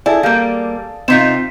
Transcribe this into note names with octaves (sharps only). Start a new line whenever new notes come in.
E4 G#4 A4 D5 G#5
G3 A#3 F5
C3 C4 D#4 F4 C6 B6 E7